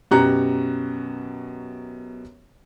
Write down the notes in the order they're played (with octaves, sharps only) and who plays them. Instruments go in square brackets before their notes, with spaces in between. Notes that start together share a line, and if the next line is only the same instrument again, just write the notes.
[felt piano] F#2 B2 G4 A#5 F#6 C#7